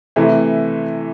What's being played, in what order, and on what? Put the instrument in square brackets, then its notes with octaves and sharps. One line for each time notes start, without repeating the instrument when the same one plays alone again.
[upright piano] C3 E3 A3 E4